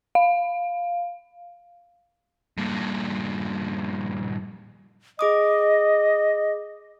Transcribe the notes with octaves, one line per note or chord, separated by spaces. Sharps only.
F5
G2 A#2
G#4 D#5 D6 D#6